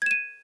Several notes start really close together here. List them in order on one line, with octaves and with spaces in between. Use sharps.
G#6 E7 D#7